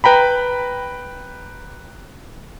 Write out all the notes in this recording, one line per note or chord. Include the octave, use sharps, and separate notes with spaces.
B4 G5 A#5 B5